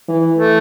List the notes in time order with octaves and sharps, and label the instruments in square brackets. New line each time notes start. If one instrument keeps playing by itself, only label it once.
[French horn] E3
[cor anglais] A3